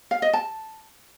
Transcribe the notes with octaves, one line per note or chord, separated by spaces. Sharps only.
F5
D#5
A5